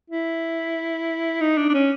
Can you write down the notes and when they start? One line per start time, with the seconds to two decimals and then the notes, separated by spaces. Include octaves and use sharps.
0.10 E4
1.41 D#4
1.58 D4
1.69 D4
1.74 C#4